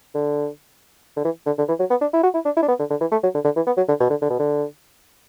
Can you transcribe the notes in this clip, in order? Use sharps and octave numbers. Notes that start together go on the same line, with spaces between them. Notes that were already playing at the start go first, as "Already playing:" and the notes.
D3
D3
E3
D3
D3
E3
F#3
B3
D4
E4
F#4
E4
D4
E4
D4
B3
D3
D3
E3
A3
F#3
D3
D3
E3
B3
F#3
D3
B2
D3
D3
B2
D3